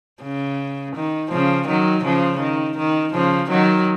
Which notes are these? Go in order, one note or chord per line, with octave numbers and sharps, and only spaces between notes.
C#3
D#3
C#3 F3
D#3 F#3
C#3 F3
D#3
D#3
C#3 F3
D#3 F#3